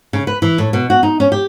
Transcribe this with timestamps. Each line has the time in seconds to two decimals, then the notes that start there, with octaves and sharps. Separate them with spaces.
0.13 C#3
0.27 B4
0.42 E3
0.58 A2
0.73 B2
0.90 F#4
1.03 D#4
1.20 C#4
1.32 G4